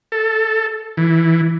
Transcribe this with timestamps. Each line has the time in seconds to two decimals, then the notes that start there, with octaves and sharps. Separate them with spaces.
0.12 A4
0.97 E3